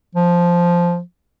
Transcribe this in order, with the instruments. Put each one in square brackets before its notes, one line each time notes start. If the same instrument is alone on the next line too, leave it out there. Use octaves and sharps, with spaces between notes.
[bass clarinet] F3